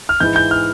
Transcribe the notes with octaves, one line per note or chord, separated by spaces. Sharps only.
F6
G#2 E3 G#3 E4 G6
G6
F6